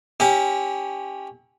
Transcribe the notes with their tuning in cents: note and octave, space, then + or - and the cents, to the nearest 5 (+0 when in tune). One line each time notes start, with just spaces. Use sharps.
C#4 +0 E4 -40 G4 +0